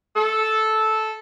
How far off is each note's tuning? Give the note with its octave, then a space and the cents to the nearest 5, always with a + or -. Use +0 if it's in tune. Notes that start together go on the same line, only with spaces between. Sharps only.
A4 -10